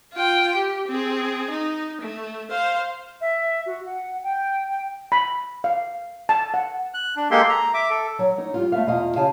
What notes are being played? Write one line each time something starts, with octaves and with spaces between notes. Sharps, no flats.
F4 G5
G4
C4 G#4
D#4
A3
C5 F5
E5
F#4
F#5
G5
G5
B5
F5
A5
F#5
F#6
D4
G#3 A#3 G4 A4 C6
A#5
E5 D6
A4
F#3
D#4 C#5
G3 F4
A3 B3 E5 F5
E2 B2 F4 D#5 F5
C#3 G4 F5 G#5 A5